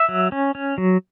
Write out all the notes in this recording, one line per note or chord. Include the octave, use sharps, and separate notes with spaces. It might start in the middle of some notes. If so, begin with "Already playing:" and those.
Already playing: E5
F#3
C#4
C#4
F#3